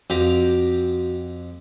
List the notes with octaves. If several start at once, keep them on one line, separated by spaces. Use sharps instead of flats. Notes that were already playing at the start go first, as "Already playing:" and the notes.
F2 F#4 G4 A#5